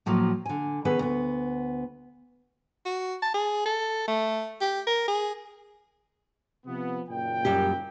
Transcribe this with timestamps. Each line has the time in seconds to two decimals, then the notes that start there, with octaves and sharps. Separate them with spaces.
0.06 A2 F3 F#3 A#3
0.46 D3 G#5
0.85 D#3 B3 C#4 G#4 A4 B4
0.99 D2 B3
2.85 F#4
3.22 A5
3.34 G#4
3.66 A4
4.08 A3
4.61 G4
4.87 A#4
5.08 G#4
6.66 C3 F3 B3
7.09 F#1 A#2 G5
7.45 F#2 G3 G4